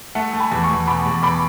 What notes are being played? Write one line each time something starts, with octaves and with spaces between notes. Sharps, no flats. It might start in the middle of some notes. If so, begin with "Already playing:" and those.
A3 F#5 A5
A3
G#5 B5
E2
A5 C#6
E2
B2 B5 D6
E2
E2 B5 D6